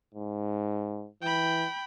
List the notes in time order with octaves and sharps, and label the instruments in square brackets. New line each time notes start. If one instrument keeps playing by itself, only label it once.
[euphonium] G#2
[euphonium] E3 [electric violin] G5 B5